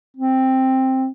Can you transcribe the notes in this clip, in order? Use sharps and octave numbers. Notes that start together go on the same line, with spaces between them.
C4